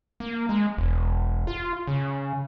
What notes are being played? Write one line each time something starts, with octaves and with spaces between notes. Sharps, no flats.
A#3
G#3
E1
F4
C#3